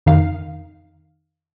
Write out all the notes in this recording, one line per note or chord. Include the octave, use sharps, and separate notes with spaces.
F2 D#3 D#4 F5